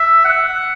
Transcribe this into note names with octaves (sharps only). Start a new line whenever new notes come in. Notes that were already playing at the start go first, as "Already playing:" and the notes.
Already playing: E5
F#5